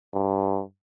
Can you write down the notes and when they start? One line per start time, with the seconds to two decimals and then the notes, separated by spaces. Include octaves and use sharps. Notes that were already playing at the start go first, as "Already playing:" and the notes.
0.14 G2